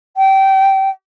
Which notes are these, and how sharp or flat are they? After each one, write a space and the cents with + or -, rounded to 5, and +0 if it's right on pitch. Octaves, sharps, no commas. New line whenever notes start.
G5 -20